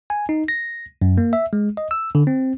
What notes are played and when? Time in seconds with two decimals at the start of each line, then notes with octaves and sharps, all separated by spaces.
0.10 G#5
0.29 D#4
0.48 A#6
1.02 F#2
1.18 A#3
1.33 E5
1.53 G#3
1.77 D#5
1.91 E6
2.15 D3
2.27 C4